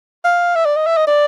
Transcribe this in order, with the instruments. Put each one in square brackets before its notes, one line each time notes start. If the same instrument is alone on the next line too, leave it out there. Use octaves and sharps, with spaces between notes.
[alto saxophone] F5
E5
D5
D#5
E5
D#5
D5